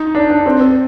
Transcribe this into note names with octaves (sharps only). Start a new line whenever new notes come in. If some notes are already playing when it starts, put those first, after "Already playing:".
Already playing: D#4
D4
D4
C4
C4